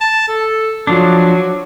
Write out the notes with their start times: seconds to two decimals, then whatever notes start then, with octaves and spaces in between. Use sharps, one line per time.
0.01 A5
0.28 A4
0.87 F3 F#3 D4